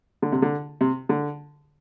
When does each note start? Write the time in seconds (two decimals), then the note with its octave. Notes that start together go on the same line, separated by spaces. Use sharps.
0.22 D3
0.32 C3
0.42 D3
0.81 C3
1.09 D3